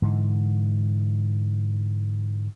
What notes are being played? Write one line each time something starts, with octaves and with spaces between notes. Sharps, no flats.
G#2 D3 E3